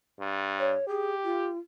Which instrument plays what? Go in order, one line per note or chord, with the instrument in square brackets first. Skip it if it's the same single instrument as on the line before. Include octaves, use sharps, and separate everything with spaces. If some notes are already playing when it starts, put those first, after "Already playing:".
[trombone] G2
[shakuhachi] C#5
[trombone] G4 [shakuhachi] G#4
[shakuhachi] F4